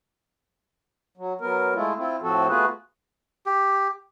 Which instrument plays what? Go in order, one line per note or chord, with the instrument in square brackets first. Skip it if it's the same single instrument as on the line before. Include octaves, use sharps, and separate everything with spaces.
[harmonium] F#3
F#3 B3 A#4
G#3 A3 E4 F4
C4 E4 F4
A2 F3 C4 F#4 A4
A3 B3 F4 F#4 G#4 B4
[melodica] G4